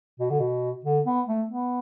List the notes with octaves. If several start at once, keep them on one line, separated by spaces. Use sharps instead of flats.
B2
D3
B2
D3
B3
A3
B3